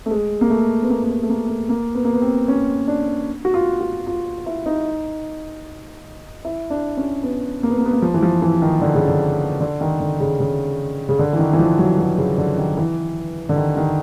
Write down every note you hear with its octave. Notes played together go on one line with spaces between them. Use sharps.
A3
G#3
A#3
A3
B3
A#3
A#3
B3
A3
A#3
A3
A#3
B3
A#3
B3
C4
C#4
D4
F#4
F4
F#4
F4
E4
D#4
E4
D4
C#4
B3
A#3
B3
A#3
B3
A#3
F3
E3
F3
E3
D#3
D3
C#3
D3
D3
D#3
D3
C#3
C#3
C#3
D3
E3
D#3
E3
F3
F#3
F#3
C#3
D3
D#3
E3
D3
D#3
D#3